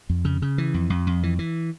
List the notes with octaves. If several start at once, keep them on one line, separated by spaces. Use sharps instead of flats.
F2
C#3
C#3
E3
F2
F2
F2
E3
E3